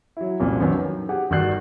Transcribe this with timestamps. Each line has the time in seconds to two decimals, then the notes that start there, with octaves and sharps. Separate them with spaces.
0.17 F#3 E4
0.40 C2 F2 A#2 C#3
0.60 F#2 D#3 B3 C#4 D4 F#4
0.78 F#3 D#4
1.09 G4 G#4 F#5
1.30 G1 D#3 F#4 D5 F#6 C7